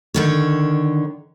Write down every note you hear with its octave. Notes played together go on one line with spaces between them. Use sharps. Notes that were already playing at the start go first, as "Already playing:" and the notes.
D3 D#3 C#5